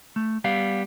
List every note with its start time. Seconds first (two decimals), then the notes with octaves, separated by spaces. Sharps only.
0.16 A3
0.44 G3 B3 F5